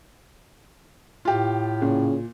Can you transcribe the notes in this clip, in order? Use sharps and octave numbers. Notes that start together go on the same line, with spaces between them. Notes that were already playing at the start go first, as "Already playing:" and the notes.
A2 F4 G4
A#2 C#3